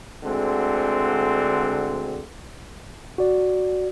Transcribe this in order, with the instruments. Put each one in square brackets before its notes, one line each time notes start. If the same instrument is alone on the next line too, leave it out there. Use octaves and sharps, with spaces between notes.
[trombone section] D2 D3 G#3 C4
[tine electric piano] F#4 D5